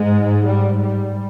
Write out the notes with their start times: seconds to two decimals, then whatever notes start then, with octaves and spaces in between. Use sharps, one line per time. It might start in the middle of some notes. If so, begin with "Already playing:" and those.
Already playing: G#2 G#3
0.44 G3
0.79 G3